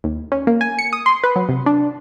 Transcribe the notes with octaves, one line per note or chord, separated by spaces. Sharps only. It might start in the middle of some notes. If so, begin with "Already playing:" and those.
D#2
C#4
A#3
G#5
C#7
D#6
C6
B4
F#3
C3
D4